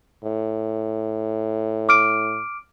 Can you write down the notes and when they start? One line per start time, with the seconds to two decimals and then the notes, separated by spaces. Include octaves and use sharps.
0.24 A2
1.89 D6 F6 D7